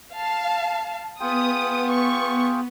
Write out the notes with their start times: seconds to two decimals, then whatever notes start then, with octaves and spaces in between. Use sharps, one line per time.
0.14 F5 A5
1.20 B3 F4 G#4 G5 D#6
1.90 C#6